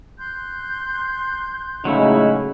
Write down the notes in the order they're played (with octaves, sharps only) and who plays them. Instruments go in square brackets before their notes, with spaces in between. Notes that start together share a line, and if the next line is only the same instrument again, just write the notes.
[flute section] C6 F#6 G6
[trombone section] A2 G#3 D#4 [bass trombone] C#3 [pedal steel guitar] F#3 A3 E4